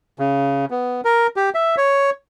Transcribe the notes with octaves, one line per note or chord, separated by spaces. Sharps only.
C#3
B3
A#4
G4
E5
C#5